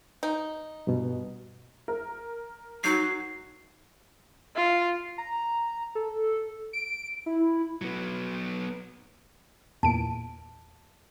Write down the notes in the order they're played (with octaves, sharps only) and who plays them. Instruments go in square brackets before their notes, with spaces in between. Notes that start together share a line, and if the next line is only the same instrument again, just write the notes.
[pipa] D#4
[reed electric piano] G2 B2
[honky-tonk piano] A#4
[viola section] F#3 [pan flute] D#4 [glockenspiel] C7
[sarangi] F4
[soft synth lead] A#5
A4
D7
E4
[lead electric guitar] F#3 B3
[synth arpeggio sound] E2 A#2 D7 [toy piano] A5